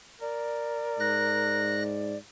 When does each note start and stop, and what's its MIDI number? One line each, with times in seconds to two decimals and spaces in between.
0.21 1.94 70
0.21 2.17 74
1.00 2.17 44
1.00 1.83 90
1.00 1.83 94